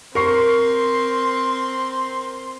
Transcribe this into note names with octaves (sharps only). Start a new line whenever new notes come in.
C4 A#4 C6 C#6 C7